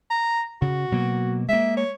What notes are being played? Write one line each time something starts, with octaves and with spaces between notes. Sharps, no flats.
A#5
C#3 F#4
B2 F#3 A#3
G#3 A#3 E5
C#5